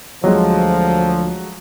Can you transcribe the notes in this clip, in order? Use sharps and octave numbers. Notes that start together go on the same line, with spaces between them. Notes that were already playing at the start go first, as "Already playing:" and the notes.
D2 F3 F#3 G#3